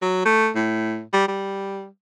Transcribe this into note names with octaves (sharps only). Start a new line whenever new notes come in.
F#3
A3
A2
G3
G3